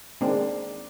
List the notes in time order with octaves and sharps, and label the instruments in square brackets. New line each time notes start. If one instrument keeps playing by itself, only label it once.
[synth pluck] D#3 G#3 C4 [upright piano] A#3 D4